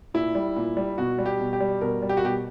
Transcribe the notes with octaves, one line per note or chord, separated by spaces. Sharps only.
A#2 E4
G3
A#2
G3
B2 F#4
G3
G4
B2
G4
G3
B2 A#4
G3
G4
F#4
B2 G4